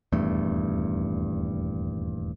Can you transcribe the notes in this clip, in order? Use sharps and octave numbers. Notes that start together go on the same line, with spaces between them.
D#1 E2 G2 A3